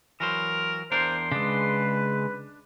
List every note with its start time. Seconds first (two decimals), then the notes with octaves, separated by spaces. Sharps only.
0.20 E3 F#3 A#4 C5
0.92 E2 D4 A#4 C5 C6
1.32 C#3 G#3 D4 B4